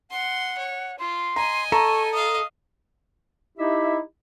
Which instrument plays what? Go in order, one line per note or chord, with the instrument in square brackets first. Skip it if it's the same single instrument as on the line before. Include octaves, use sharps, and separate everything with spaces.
[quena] F#5 [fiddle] C6
[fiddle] C#5
[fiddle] F4 [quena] C6
[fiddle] D#5 G#5 [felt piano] A#5
[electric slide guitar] A4 [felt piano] A#5 [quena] C#6
[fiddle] D#5 F5 [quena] D#6
[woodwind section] D#4 E4 G4 E5